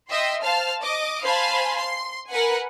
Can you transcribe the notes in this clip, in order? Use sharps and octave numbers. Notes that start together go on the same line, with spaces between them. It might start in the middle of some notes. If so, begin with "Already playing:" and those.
D#5 E5 G5 C6
C5 F5 A5 F6
D#5 D6
C5 F5 G#5 A5 B5 C6
C6
A#4 B4 F#5 G#5